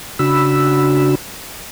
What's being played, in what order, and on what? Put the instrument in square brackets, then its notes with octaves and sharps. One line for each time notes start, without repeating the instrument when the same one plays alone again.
[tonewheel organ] C#3 D4 F#4 B5 E6